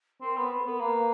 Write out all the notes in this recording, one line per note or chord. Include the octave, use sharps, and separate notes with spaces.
C4 A#4
B3 B4
B4
A4
B3 A#4
A#3 B4